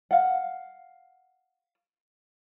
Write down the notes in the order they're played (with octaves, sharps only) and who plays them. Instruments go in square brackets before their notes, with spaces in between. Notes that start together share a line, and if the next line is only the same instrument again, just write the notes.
[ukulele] F5 F#5